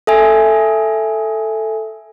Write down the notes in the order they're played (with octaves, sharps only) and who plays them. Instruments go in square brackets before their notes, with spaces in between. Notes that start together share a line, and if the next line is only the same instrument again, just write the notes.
[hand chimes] A4 E5 G#5